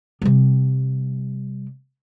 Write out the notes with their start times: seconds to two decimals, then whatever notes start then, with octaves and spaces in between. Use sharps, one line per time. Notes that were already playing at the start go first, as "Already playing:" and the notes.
0.22 C3 G3